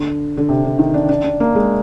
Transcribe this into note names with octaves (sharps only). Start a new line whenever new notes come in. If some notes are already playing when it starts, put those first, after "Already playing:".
Already playing: D3
D3
C3
D3
D#3
D4
D4
D4
A#3
G#3